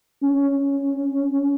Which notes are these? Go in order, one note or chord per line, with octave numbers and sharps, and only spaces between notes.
C#4